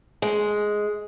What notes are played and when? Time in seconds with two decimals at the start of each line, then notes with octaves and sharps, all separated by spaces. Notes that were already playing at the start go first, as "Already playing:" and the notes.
0.22 G#3